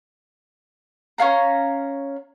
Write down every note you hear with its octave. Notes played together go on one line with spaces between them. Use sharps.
C#4 C#5 F5 A#5